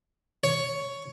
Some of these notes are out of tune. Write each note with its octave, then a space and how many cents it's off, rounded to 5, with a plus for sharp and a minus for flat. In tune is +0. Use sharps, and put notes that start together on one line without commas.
C#5 +10